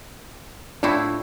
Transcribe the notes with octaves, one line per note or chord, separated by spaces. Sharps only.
A2 C4 D4 E4 F4 C#6